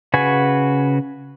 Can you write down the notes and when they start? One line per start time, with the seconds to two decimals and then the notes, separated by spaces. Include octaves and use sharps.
0.14 C#3 F#4 B4 G#5